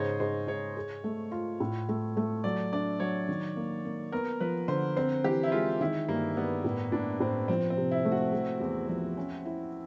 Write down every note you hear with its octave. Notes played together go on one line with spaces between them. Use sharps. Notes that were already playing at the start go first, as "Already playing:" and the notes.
Already playing: G#2 C#3 C5 C#5 D#5
G#2 C5
G#2 C#5
G#4
A3
F4
A2
A3
A3
F#3 D5
D4 D5
F#3 C#5
D#3
A#3
A#3
B3 A#4
F3 B4
D3 C5
C4 C5
E3 G4
E4
G#3 F4
D#3 E4
G2 A#3
G2 B3
A2
A2 D4
A2 C4
F3 C4
C4
C3
E4
A3
F#4
A3
E2
F3
C#4
E4